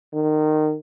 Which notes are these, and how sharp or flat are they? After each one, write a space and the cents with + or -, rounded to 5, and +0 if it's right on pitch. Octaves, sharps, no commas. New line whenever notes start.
D#3 -20